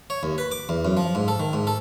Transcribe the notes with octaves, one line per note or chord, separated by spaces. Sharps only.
C#5
D#2
B4
D6
E2
F#2
F3
G#2
A4
D#3
G#2
A4